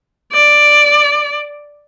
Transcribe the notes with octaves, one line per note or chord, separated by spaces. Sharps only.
D5